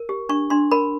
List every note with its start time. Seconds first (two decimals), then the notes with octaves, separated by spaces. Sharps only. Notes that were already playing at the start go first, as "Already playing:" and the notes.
Already playing: A#4
0.09 G4
0.29 D4 C#6
0.50 D4 C6
0.71 A#4 B5